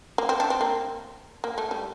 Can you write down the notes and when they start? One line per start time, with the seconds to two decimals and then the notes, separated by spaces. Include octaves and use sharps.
0.18 A#3
0.29 C4
0.40 D4
0.50 C4
0.61 A#3
1.44 A#3
1.58 A3
1.71 G3